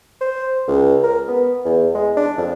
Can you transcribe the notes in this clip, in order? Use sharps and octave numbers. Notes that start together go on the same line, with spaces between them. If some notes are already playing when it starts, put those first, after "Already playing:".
C5
C#2
A#4
B3
E2
G#3
D4
F2